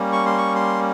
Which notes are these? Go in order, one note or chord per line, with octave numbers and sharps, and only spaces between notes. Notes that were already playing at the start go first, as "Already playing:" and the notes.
Already playing: G3 A#3 C#4
C#6
C6
C#6
C6